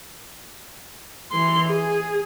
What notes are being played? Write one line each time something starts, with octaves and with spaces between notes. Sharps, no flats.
E3 C6
G#4